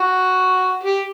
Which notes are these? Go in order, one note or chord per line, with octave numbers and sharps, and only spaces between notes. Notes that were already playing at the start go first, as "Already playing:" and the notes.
Already playing: F#4
G4